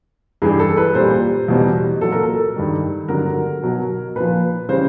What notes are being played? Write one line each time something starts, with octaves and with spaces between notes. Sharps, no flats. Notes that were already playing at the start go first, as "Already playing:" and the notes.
G2 E3 G3 G#4
A4
B4
A#2 G3 C5
E2 B2 G3
A#2 F#3 A4
A#4
A4
G2 D#3 G3
G2 D3 F#3 A#4
B2 F#3
A#2 F3 B4
C#3 E3 G3 C5